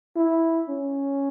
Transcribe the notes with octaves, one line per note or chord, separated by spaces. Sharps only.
E4
C#4